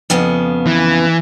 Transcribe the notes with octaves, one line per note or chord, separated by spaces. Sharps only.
F2 C#3 B3
E3